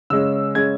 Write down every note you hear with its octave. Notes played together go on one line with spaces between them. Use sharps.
C#3 G#3 C#4 E6
C#3 G#3 C#4 G#6